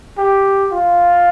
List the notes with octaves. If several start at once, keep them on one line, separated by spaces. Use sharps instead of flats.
G4
F4